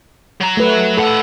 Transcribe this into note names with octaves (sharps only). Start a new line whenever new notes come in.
F#3 A#5
A3 B4
A2 A4 F#5